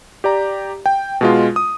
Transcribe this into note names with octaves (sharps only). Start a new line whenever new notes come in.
G4 D5 A#5
G5
B2 G#3 F4
D#6